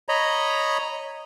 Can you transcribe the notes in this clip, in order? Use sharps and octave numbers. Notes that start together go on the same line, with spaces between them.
C#5 D#5 A#5 B5